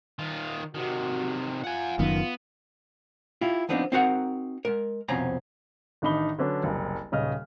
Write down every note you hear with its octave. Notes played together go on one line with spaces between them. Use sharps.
D#3 F4
C3 D#3 F#4
F4 F#5 G#5
F#1 F#2 D#3 B3
E4 F4 G4
F3 B3 C4 D4 D#4
C4 D#4 E4 F#4 A#4 F#5
G#3 A#4
C2 F2 B2 C4 C#4 A#5
A1 D#3 D4 D#4 B5 G7
D3 F#3 C#4 D4 B4
F#1 C2
D#1 C#3 D#5 F6